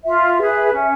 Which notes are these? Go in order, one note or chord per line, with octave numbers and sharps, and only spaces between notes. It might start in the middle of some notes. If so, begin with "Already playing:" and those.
F4 E5
G#4 B4
C#4